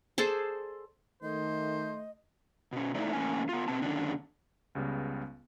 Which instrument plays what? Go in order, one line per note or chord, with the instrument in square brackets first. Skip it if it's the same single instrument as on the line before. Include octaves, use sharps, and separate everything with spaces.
[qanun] G#4 A4 C5 D5
[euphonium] D#3 [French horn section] A3 [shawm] C5 [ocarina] D#5
[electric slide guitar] B2 C#4
A3 D#4 E4 A4 C5 D5
E2 A2 A#3 C#4 G#5
B3 F4
B2 C4 A5
F#2 D3 D#3 C#4 D4
[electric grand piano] C#2 C#3 G3 B3